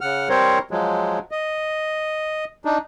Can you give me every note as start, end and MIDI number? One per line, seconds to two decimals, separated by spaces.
0.01 0.29 49
0.01 0.29 78
0.01 0.29 89
0.29 0.59 55
0.29 0.59 60
0.29 0.59 70
0.29 0.59 72
0.29 0.59 73
0.71 1.19 53
0.71 1.19 54
0.71 1.19 56
1.31 2.45 75
2.65 2.78 62
2.65 2.78 63